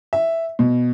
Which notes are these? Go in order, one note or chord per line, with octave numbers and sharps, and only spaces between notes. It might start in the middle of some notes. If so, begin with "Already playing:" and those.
E5
B2